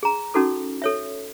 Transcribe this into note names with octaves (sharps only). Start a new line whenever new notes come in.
G#4 A#5
C#4 D#4 F#4 A4 D6
A4 C#5 E5